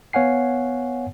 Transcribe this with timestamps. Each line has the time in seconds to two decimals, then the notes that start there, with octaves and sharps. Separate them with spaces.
0.13 B3 C#5 F5 F#5 G#5 C7